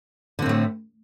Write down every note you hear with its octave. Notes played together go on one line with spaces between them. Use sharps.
A2 D3 A3 C4